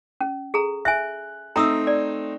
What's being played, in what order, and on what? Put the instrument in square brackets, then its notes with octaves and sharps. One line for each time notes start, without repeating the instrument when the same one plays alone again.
[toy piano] C#4
G#4 A4 A#5
[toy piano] E5 G#5 [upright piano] F#6
[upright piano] A3 C4 D#4 [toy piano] A#5 D#6 E6
[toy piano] D5